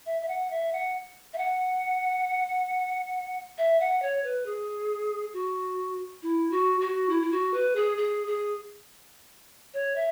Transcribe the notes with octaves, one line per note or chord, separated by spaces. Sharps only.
E5
E5
F#5
E5
F#5
E5
F#5
E5
F#5
C#5
B4
G#4
F#4
E4
F#4
F#4
E4
E4
F#4
B4
G#4
G#4
G#4
C#5
E5